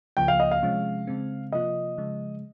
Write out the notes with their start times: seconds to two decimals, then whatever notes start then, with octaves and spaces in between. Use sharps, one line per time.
0.17 C#2 C#3 F3 A#3 G5
0.28 F5
0.40 D#5
0.51 F5
0.62 C3 F3 G#3 C#4
1.07 C#3 G#3 C4
1.52 C3 F3 A#3 F4 D#5
1.98 C#3 F3 G#3